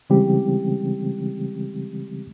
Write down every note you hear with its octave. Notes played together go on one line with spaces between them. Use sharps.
C#3 E3 G3 G#3 C4 G4